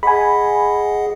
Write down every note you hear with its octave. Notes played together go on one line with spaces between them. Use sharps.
G#4 D#5 F#5 G#5 B5